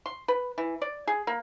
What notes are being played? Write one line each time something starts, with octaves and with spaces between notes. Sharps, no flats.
C6
B4
E3
D5
G#4
A#3